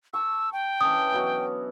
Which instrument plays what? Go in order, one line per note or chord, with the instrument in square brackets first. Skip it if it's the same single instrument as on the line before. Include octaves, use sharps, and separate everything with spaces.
[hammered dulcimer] A5 C#6 [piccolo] E6
[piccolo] G5
[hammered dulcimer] E3 C#4 D4 [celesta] D#6
[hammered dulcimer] B2 F#3